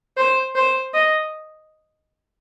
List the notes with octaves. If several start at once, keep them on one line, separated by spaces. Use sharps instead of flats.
C5
C5
D#5